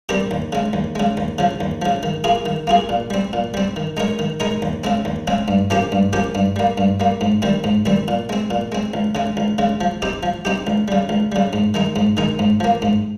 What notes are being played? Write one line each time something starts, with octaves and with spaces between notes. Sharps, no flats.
G3 C4 G4 A#4
D#2
C#3 G#3
D#2
C#3 G#3
D#2
C#3 F3
D#2
C#3 F3
D#3
A#3 F4 G#4
D#3
A#3 F4 G#4
A#2
G3 C4
A#2
G3 C4
D#3
G#3 D#4 A#4 C#5
D#3
G#3 D#4 A#4 C#5
D#2
C#3 G#3 C4
D#2
C#3 G#3 C4
G2
F3 A#3 C#4 G4
G2
F3 A#3 C#4 G4
G2
G3 A#3
G2
G3 A#3
G#2
D#3 G3 C4
G#2
D#3 G3 C4
A#2
G#3 C4
A#2
G#3 C4
C#2
C#3 G#3
C#2
C#3 G#3
F3
C4 D#4 G4
F3
C4 D#4 G4
C#2
C#3 G3
C#2
C#3 G3
G#2
D#3 G#3 D#4
G#2
D#3 G#3 D#4
G#2
F3 A#3
G#2